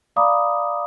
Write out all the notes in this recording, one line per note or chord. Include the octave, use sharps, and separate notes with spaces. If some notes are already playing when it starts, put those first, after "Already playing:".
D5 F5 A#5 B5 D6 D#6